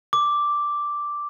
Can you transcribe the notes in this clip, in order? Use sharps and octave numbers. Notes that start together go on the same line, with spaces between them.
D6